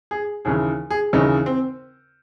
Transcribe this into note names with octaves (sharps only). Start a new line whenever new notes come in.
G#4
D#2 C#3 E3 G#4
G#4
D#2 C#3 E3 D#4
C4